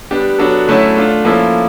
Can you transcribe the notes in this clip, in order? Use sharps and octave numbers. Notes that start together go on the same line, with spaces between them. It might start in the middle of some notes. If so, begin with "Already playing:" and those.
G3 B3 D4 G4
F#3 B3 D4 F#4 A4
D3 F#3 A3 C#4 E4
A3 D4 F4
F3 A#3 C#4 E4 A4